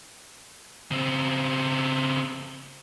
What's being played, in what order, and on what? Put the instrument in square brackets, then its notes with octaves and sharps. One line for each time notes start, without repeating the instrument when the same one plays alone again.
[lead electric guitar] C#3 C4